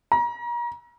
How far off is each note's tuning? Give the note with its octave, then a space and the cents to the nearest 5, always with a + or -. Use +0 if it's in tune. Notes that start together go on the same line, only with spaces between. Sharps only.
A#5 +35